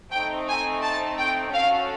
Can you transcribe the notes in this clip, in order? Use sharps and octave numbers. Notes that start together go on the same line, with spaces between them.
A3 C4 D#4 G5
G#5
A5
G5
C#4 F#4 A4 F5